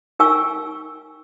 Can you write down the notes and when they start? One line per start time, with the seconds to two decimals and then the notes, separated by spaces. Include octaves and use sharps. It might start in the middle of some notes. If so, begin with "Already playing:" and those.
0.19 D#4 A#4 G5 G#5 C#6 E6